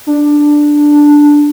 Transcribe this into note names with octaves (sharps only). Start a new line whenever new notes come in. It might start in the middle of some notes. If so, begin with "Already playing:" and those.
D4